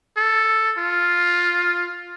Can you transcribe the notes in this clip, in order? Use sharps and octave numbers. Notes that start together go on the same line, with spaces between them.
A4
F4